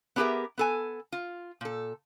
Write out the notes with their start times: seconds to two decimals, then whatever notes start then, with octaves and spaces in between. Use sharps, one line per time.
0.16 B3 D4 G4 G#4 A#4 E5
0.58 B3 A4 G#5
1.12 F4
1.61 A#2 A4